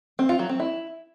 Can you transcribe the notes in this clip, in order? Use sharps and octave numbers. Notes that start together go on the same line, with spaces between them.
C4
F4
F#3
C4
E4